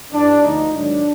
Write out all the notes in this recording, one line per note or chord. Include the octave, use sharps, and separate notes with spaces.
G2 E3 D4
D2 D3 F3 D#4
G#2 D#3 F#3 D4